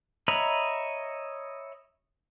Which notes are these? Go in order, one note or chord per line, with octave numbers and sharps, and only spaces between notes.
C#5 D#5 E5 A#5 B5